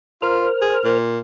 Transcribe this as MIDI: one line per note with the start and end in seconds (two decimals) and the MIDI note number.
0.22 0.47 65
0.22 0.98 70
0.22 0.98 72
0.22 0.98 89
0.62 0.75 68
0.84 1.19 46